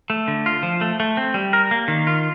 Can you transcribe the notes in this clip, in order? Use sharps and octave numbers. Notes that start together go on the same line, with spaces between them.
A3
D3
F4
F3
A3
A3
C4
G3
A#4
A#3
D#3
F4